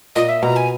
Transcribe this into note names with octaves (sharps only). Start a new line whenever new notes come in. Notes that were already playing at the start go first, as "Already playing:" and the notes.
A#2 D#5
E5
B2 A#5
G#5